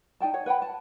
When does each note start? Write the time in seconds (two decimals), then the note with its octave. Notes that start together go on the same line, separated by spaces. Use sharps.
0.20 D#4 D5 G5 A5
0.34 C#5 F#5
0.46 B4 F#5 G5 B5
0.62 A5